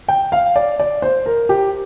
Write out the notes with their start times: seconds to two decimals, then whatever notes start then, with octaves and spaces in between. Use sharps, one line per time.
0.08 G5
0.32 F5
0.56 D5
0.80 D5
1.02 C5
1.26 A#4
1.49 G4